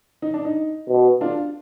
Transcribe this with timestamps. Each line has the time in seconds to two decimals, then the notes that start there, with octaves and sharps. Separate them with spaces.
0.22 D#4
0.34 D4
0.45 D#4
0.89 B2
1.21 D4 F4